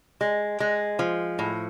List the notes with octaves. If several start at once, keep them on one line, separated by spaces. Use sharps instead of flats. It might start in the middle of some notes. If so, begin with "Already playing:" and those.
G#3
G#3
F3
A2